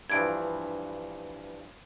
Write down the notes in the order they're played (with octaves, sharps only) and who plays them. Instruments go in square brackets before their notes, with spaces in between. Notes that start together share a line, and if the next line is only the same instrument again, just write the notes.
[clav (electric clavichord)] G2 E3 F3 [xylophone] G#6 D7